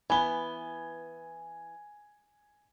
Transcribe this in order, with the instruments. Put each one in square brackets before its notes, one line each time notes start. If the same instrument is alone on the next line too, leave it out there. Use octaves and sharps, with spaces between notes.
[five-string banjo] E3 B3 [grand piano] G#5 G7